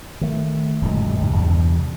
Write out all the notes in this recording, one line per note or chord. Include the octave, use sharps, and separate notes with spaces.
D#3 A3
D1 F#2 A#2 G#3
C#2 G#2 C3
E2 G2 C3